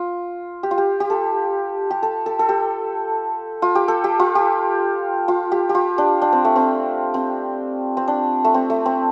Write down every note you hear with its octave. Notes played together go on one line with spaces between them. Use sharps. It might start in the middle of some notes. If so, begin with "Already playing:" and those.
Already playing: F4
G4
F4
G4
G4
A4
G4
A4
A4
A4
G4
F4
G4
A4
G4
F4
G4
F4
G4
G4
F4
D4
D4
C4
A3
C4
C4
C4
D4
A3
C4
A3
C4